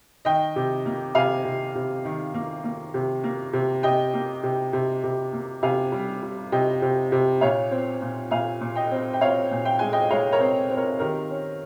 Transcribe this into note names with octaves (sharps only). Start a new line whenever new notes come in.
D#3 D#5 G5
C3
A#3
C3 F5 G#5
C3
C3
D#3
A#3
A#3
C3
A#3
C3
C3 D#5 G5
A#3
C3
C3
C3
A#3
C3 F5 G#5
G3
G3
C3 D#5 G5
C3
C3
A#2 C#5 F5
C4
A#2
A#2 F5 G#5
A#2
D#5 G5
C4
G5
C4 C#5 F5
A#2
G5
G#3 G#5
D#5 G5
G#3 C#5 F5
A#4 C#5
C4
C4
A#4 C#5
D#3 G4 A#4
C#4